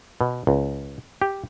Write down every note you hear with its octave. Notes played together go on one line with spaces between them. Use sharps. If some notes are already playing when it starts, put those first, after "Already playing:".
B2
C#2
G4